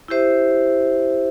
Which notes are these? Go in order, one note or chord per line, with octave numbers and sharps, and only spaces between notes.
E4 G4 C5 E5